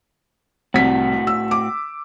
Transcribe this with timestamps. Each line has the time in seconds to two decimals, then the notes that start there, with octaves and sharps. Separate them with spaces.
0.74 C2 A2 F#4 B6
1.27 E6
1.51 D6